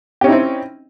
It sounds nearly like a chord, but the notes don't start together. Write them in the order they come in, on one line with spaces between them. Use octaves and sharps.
G4 C#4 D#4 E4 C4